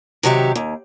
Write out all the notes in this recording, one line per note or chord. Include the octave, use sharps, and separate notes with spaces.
C3 D#3 F#3 G4 A4 E5
D#2